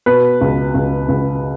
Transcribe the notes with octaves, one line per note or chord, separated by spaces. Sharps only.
B2 B4
C#2
C#2
C#2